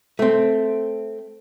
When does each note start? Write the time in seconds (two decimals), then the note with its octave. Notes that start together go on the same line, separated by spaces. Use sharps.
0.19 A3 C4